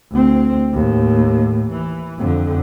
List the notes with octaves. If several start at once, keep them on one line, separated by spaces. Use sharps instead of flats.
D2 C4
D#2 A2
E3
F2 D3